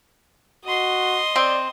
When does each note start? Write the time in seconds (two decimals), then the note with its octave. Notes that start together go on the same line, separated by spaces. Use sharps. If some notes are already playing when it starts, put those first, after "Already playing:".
0.65 F#4 D#5 C6
1.36 C4 D5